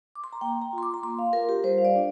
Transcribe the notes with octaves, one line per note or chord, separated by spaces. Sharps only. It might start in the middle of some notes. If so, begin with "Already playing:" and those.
D6
C6
A#5
A#3 G5
A#5
F4
C6
D6
A#5
A#3 C6
F5
F4 A#4
G4
G3 C5
F5
D5
D4 F4